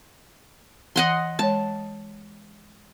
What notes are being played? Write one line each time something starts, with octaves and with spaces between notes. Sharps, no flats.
E3 D#5 F#5 C6
G#3 C#5 A5